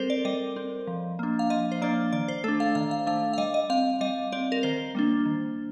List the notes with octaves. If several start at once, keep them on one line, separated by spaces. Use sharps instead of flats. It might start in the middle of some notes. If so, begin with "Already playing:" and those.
Already playing: G3 C4 A4 A#4 C5
D5
G3 D#5
C4
F3
A#3 D4
F5
F3 D#5
C5
A#3 D4 D5
D#3 D5
C5
A3 D4 A4
F5
D#3 F5
F5
A3 D4 F5
F5
G3 D#5
D#5
C4 F5
G3 D#5
C4 D5
A#4
D#3 C5
G3 A#3 D4
D#3